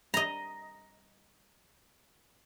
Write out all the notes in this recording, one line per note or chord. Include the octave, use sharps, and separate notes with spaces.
D#5 A#5